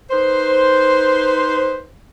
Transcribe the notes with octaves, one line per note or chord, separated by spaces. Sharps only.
D#4 B4 C5